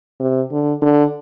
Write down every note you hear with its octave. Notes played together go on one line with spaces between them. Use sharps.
C3
D3
D3